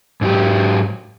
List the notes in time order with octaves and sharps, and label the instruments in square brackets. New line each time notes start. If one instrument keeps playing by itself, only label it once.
[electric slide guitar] G#2 F#3 G4